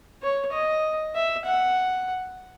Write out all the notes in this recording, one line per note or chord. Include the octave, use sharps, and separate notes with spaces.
C#5
D#5
E5
F#5